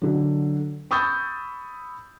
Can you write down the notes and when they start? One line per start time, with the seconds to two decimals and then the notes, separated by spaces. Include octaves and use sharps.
0.02 D3 F#3
0.91 B5 C#6 D#6 E6 G6 A6